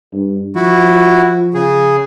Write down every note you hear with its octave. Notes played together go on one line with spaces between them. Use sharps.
G2
F3 E4 F#4
C#3 G#4